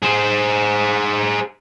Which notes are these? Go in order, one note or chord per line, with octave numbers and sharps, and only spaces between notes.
G#4 C5